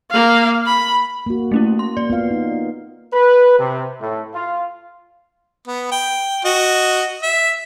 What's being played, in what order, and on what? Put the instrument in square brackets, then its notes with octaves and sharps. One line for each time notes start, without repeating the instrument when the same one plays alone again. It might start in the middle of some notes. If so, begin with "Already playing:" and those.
[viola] A#3 F5
B5
[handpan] A#3 F#4
[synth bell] A3 C#4 E4
C6
[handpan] A#3 [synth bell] D5
[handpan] B3 F4 F5
D#4
[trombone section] B4
C3
A2
F4
[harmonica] B3
G5
F#4 D#5
E5